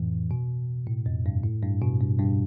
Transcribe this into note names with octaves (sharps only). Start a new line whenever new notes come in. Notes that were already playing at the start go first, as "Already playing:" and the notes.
Already playing: F2 A2 E3
B2
A2
F2
G2
A2
G2
B2
G2
G2